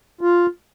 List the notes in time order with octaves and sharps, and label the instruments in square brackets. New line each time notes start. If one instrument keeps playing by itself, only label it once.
[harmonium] F4